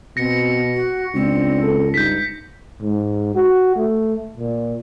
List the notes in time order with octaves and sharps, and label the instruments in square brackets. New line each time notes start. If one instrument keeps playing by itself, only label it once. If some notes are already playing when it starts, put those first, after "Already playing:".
[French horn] B2 [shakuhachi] C4 [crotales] A#6 C#7
[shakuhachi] F#4
[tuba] C#2 [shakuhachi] C4 [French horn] D4
[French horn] A4
[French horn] G2 [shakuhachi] D#4 [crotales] G6 B6
[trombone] G#2
F#4
A3
A#2